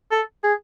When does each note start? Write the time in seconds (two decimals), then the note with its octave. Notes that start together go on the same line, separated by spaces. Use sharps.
0.12 A4
0.44 G#4